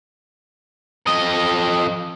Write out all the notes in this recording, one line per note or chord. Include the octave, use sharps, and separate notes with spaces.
F2 D#5